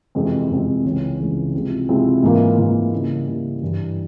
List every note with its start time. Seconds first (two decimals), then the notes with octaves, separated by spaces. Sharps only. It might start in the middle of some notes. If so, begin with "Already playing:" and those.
0.15 F2 C3 E3 G#3 C4
0.50 F2 C3 E3 G#3 C4
0.84 C#2 C#3 E3 G#3 C#4
1.19 C#2 C#3 E3 G#3 C#4
1.54 C3 F3 G#3 C4 E4
1.89 C3 F3 G#3 C4 E4
2.23 G#2 E3 A#3 F4
2.57 G#2 E3 A#3 F4
2.92 C#3 G3 A#3 E4
3.27 C#3 G3 A#3 E4
3.62 G2 E3 G3